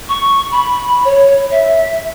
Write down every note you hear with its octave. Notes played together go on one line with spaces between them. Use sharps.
C#6
B5
C#5
E5